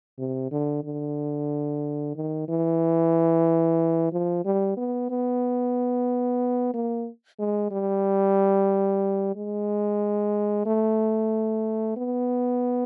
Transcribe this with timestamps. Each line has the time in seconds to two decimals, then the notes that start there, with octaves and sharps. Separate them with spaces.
0.19 C3
0.52 D3
0.85 D3
2.16 D#3
2.48 E3
4.13 F3
4.45 G3
4.77 B3
5.10 B3
6.74 A#3
7.39 G#3
7.71 G3
9.36 G#3
10.66 A3
11.97 B3